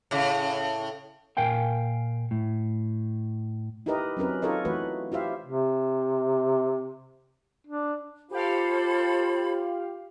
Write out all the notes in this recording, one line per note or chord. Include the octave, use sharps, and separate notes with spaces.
A2 C#3
A#2 A#4 F5 G5 G#5
A2
D#4 E4 G4 A#4 B4 D#5
F#3 C4 C#4 A#4 B4
D#4 F4 A4 A#4 C#5 D#5
E3 A3 F#4 B4
E4 F4 G4 C5 E5 F5
C3
D4
F4 G4 A4 C5 F5 B5